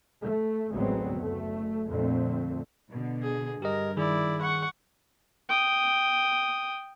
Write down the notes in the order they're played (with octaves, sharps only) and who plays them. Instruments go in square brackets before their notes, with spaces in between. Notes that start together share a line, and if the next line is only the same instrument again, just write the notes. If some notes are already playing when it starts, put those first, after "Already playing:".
[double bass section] A3
A1 D2 F#3 G#3 B3 C4
F#1 A3
F2 A#2 D3 A3 C4
[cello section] B2 D3
[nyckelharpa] G#4
[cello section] G2 [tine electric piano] G4 D#5 [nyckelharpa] A#4
[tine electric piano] D#3 G#4 [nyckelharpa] E4 D5
[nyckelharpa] F#5 C#6
G5 D#6